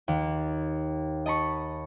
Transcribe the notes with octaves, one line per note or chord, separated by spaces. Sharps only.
D#2
D#5 A5 B5 C#6